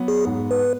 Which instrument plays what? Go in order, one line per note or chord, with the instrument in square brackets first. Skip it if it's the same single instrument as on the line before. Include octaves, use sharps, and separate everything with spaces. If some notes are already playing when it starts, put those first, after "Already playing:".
Already playing: [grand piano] F#3 B3
[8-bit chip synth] G#4
[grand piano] G#2
[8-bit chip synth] B4